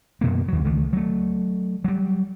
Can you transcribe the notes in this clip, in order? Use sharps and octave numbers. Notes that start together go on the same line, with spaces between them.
F#2 B2 A#3
D#2 F#3
C#2 D#3 A3
F#3 A3
F#3 G3